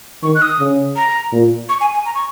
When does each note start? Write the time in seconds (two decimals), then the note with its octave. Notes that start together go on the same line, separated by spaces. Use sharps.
0.23 D#3 C#6
0.35 F#6
0.42 D#6
0.60 C#3
0.96 A#5
1.32 A#2
1.69 C#6
1.81 G#5
1.94 G#5
2.06 A#5
2.15 C#6